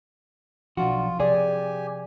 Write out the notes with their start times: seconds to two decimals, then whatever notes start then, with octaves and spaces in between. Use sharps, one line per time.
0.77 B1 F3 D4 F4 F#4
1.20 C3 G4 G#4 D5 G#5